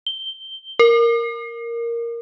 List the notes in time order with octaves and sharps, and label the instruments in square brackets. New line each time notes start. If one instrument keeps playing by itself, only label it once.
[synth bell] G7
A#4